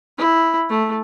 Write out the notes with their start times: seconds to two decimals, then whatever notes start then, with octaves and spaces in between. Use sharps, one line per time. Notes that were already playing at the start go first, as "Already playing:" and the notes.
0.18 E4
0.69 A3